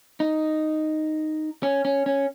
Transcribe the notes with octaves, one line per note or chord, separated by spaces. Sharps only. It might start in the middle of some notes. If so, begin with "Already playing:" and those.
D#4
C#4
C#4
C#4